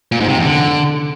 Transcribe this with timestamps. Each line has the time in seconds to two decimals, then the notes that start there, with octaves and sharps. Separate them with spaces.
0.12 A#2
0.20 G#2
0.29 C3
0.37 E2
0.46 D3